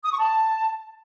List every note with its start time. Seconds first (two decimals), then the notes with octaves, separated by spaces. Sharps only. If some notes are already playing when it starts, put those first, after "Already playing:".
0.04 D#6
0.11 C#6
0.18 A5